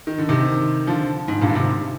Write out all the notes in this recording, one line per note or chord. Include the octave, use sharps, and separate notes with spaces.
D#3
D3
C3 D#3
D3 F3
G#2
G2 A#2
D3
G#2 C3